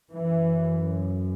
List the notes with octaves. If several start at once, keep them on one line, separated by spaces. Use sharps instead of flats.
F#2 E3